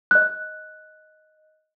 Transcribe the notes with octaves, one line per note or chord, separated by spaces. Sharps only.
D#5 F#6